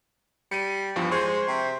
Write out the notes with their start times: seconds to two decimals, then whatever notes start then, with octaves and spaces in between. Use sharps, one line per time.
0.51 G3 C#7 D#7
0.96 E2 G2 F3
1.11 G#3 C5 C6 C#6
1.48 C3